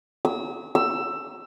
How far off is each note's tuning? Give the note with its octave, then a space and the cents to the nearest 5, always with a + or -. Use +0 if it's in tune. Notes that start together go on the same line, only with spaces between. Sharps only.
E6 -30
E6 +15